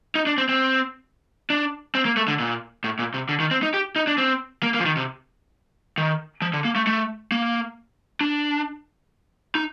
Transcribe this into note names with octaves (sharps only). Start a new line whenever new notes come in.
D#4
D4
C4
C4
D4
C4
A#3
A3
D3
A#2
A2
A#2
C3
D3
D#3
C4
D#4
G4
D#4
D4
C4
A#3
A#3
F3
D#3
C3
D#3
F3
D3
A#3
A3
A3
A#3
D4
D#4